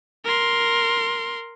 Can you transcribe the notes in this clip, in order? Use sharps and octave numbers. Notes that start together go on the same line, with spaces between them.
A#4 C6